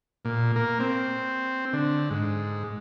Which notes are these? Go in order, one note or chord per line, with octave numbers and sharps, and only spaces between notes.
A#2
A#3
C4
D3
G#2